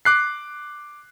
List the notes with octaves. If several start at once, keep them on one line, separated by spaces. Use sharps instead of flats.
D6 F#6 C7